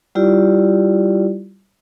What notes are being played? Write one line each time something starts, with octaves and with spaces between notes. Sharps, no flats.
G3 E4 F4 G4 D5